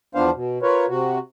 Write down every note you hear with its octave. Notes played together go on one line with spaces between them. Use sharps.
E2 F3 B3 D4 C5 F5
B2
F4 A#4 B4 C#5
C3 F#4